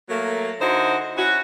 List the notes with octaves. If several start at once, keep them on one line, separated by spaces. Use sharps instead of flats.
F#3 A3 A#3
D3 D#4 E4 F#4 C5
C#4 E4 F#4